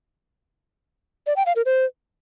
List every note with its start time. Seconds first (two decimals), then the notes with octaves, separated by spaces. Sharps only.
1.27 D5
1.36 G5
1.46 F5
1.56 A#4
1.66 C5